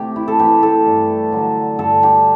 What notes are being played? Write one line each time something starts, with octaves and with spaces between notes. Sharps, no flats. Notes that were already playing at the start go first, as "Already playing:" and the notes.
Already playing: C3 A3 G4
E4
A4
E3 A3 G4
A4
G2
D3 F#3
G2 A4
G4